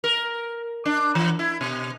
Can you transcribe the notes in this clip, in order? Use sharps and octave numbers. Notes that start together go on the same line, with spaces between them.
A#4
D4
E3
E4
B2